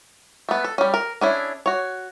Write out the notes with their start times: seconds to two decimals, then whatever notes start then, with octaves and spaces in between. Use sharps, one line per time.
0.49 A3 B3
0.64 A4
0.78 G3 C#4
0.94 A#4
1.21 C#4 D4 E4 G#4
1.66 F#4 C#5